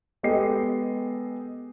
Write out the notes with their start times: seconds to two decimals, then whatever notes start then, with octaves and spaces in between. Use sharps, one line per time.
0.23 G#3 B3 G4 A4 D#5 C7